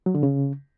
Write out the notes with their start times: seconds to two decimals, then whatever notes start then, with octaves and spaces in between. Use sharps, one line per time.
0.06 F#3
0.15 D3
0.23 C#3